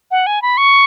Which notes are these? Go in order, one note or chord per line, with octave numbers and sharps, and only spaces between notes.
F#5
G#5
B5
C#6